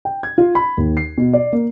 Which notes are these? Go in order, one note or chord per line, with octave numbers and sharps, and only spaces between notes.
G5
G#6
F4
B5
D#2
C7
B2
D5
A#3